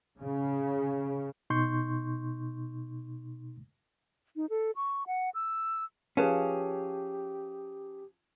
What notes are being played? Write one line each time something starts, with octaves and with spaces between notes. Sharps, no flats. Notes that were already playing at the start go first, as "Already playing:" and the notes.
C#3
B2 D#4 C6 C#6 G6
D#4
A4
C#6
F#5
E6
F3 C#4 G4 G#4 B4 F5 A5